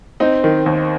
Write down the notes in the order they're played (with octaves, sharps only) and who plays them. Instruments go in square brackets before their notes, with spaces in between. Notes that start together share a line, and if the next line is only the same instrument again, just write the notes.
[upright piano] C4 [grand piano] D#4
[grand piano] D#3
D#2